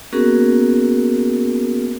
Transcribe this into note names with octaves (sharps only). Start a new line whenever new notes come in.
A#3 B3 C#4 F#4 G#4 A#4